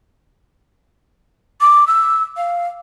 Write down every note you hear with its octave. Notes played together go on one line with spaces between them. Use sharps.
D6
E6
F5